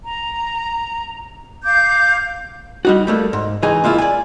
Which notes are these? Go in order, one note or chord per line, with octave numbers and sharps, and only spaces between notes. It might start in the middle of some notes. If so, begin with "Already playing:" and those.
A#5
F5 D6 G6
G3 D#4 F#4
G3 A3 A#3
G#2
C#2 E3 D#4 G#4 G#5
G#3 A#3 E4 F4
D5 G#5